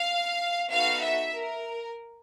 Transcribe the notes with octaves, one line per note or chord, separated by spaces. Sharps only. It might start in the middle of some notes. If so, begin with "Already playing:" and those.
Already playing: F5
B3 D#4 F#4 A4 F5
E5
A#4